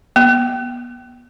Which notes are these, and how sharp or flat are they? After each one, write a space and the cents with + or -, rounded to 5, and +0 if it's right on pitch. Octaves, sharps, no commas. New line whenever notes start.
B3 -30